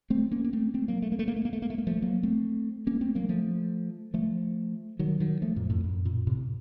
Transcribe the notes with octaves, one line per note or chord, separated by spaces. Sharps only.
A3 C4
A#3 C#4
A#3
A3 C4
A3 C4
F#3 A#3
A3
A#3
A3
A#3
A3
A#3
A3
A#3
A3
A#3
F3 A3
F#3 A#3
A3 C4
A#3 C#4
A3 C4
F#3 A#3
F3 A3
F3 A3
D#3 F#3
D#3 F#3
F3 A3
F#2 A#2
F2 A2
F#2
F#2 A#2
A2 C3